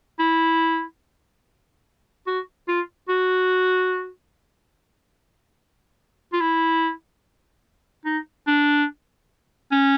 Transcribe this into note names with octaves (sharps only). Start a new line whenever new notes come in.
E4
F#4
F4
F#4
F4
E4
D#4
D4
C#4